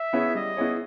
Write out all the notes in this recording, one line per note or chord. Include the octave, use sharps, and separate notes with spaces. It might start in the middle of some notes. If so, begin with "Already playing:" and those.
Already playing: E5
B3 E4 G#4 C#5
G3 D#5
B3 E4 G#4 C#5